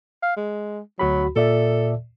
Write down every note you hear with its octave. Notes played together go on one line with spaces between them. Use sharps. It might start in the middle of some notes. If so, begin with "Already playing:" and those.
F5
G#3
D2 F#3 F#4 B5
A#2 A4 D5 E5